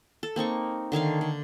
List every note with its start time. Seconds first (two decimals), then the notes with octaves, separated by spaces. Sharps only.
0.23 A4
0.36 A#3 C4 D#4 C#6
0.92 D3 D#3 C#5 F5
1.21 D3